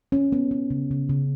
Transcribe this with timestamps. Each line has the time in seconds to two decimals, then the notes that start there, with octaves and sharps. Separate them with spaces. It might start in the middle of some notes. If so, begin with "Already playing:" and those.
0.12 C#4
0.32 B3
0.51 B3
0.70 C#3
0.91 C#3
1.09 C#3